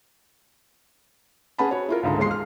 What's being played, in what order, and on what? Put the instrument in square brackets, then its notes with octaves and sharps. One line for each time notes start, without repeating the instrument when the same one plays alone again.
[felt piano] C#4 G#4 B4 F#5 A5 B5
F#4 C#5
E4 F4 A#4
C#2 G#2 D3 A5
E1 D#2 G#3 C6 C7
F6